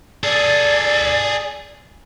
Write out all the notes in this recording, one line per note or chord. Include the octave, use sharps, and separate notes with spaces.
G#4 A4 D5